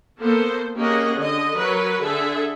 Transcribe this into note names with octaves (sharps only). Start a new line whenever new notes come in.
A#3 B3 A4 C5
A#3 C#4 G4 G#4 D#5 F#5
D3 D#5
F#3 A#4 B4
D3 G#4 A4 E5